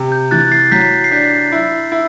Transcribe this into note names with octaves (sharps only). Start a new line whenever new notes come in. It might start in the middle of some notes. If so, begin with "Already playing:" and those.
Already playing: C3
G6
E3 F#6 A6
A6 C7
F#3 G6 B6
C7
D4 G6 B6
E4
E4